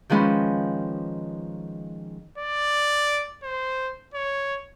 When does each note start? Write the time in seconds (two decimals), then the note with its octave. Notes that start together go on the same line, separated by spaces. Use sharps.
0.10 D#3 F3 G#3 C#4 B4
2.38 D5
3.43 C5
4.14 C#5